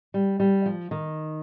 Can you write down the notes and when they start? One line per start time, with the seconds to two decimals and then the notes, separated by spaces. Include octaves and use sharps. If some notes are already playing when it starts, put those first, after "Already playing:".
0.14 G3
0.40 G3
0.66 F3
0.91 D#3